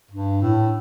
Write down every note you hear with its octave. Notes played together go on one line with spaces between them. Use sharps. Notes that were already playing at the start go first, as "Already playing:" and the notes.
G2
A2